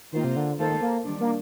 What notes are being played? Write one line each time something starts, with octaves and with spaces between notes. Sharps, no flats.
D#3 A#3 F4 C5
C3
D3
D#3 A#3 F4 A4 C5
A#3
D#3 G3 D4
A#3